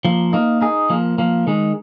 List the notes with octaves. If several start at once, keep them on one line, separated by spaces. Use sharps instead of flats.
F3 A#3
A#3 D#4
D#4 G#4
F3 A#3
F3 A#3
D#3 G#3